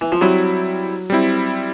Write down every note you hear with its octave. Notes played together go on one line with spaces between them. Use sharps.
E3
F3
F#3 G3 C4 E4
G3 C4 E4